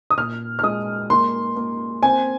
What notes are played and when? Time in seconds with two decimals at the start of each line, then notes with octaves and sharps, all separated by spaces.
0.10 D#6
0.17 A#2 F6
0.59 F6
0.63 G#3 D#6
1.10 A#3 C6
1.56 A#3
2.03 C4 G#5